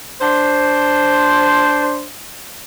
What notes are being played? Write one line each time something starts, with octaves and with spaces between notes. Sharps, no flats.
D4 C5